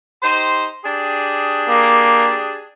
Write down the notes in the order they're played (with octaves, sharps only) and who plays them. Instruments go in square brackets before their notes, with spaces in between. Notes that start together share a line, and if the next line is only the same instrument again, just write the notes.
[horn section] D#4 G4 C5
D4 G4 G#4
[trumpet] A#3